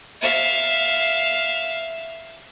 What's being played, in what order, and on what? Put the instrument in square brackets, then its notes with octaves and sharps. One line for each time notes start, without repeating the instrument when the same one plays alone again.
[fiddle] E5 F5